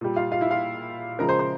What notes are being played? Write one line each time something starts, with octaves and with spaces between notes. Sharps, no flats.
A#2 G3
F4 F5
F4 F5
E4 E5
F4 F5
C#3 F3 G#3 A#4 A#5
C5 C6
C5 C6